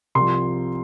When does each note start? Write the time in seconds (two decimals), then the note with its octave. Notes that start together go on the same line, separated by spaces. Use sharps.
0.15 C2 C3 F3 C6